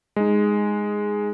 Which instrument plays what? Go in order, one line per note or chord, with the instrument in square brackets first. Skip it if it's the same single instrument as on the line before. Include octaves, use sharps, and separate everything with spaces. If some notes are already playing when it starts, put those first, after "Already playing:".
[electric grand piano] G#3 D#4